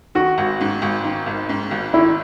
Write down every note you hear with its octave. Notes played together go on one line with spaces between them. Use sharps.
D#3 F#4
G#1
G#2
G#1
D#3
G#1
G#2
G#1
D#3 E4